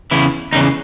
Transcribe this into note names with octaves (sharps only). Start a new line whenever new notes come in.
E2 C#3 E3 E4
E2 C#3 E3 D#4